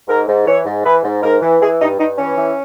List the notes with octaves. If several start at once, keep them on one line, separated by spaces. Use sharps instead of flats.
G#2 A#4
G#2
E3 C#5
G#2
E3 B4
G#2
G#2 A#4
E3
E3 G#4
G2 D#4
G2 D#4
E3 C#4
E3